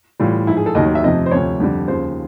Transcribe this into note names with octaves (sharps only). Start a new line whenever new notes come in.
A2 E3 G3 F4
G#2 F3 E4
G#4
A4
D#2 D#3 F#3 D#5
E5
F2 C3 F3 D#5
C5
D2 C3 F3 C#5
F2 D3 G3
D#2 C#3 F3 C5